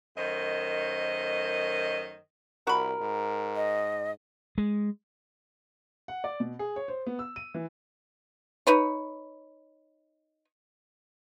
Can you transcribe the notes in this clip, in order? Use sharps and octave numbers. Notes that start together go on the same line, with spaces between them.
F#2 D#3 A3 C5 D#5
C2 F#4 A#4 B5
G#2
D#5
G#3
F#5
D5
B2
G#4
C#5
C5
B3
E6
D#7
E3
D#4 B4 C#5